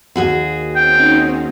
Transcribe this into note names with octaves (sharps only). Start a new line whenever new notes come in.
D#2 F#4 G#4
C4 C#4 D#4 G5